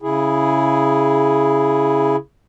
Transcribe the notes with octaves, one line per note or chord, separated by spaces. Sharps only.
C#3 E4 G#4